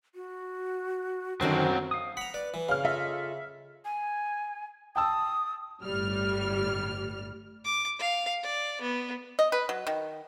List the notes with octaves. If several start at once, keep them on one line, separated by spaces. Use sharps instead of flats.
F#4
F#2 D3 D#3 F#3 C4 C5 A#5
F5 D#6
F#5 A#5 B5
B4 D5
E3
C#3 F5 F6
F4 A4 D#5 E5
G#5
G5 A5 D#6 E6
G1 A2 G3 F6
D6
F5
D5
B3
D#5
B4
F#3
D#3